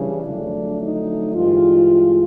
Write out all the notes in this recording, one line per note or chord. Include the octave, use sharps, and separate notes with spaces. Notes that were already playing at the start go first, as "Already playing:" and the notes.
Already playing: C#3 E3 G3 D4
F2 D3 F#3 A3
D#4
G2 E3 G#3 F4